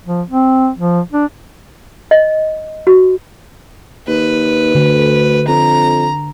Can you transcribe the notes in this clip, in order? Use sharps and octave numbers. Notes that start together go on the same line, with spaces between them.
F3
C4
F3
D4
D#5
F#4
D#2 B4
D2 D3
F2 A#5